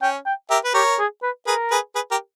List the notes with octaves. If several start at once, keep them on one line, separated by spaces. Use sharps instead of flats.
C#4 G5
G5
G4 A#4 E5
B4
G4 A#4 C#5
G#4
B4
G#4 A#4 B4
G#4 B4
G#4 B4
G4 A#4